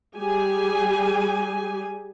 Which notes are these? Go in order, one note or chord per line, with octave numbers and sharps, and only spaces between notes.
G3 G4 G#4 G#5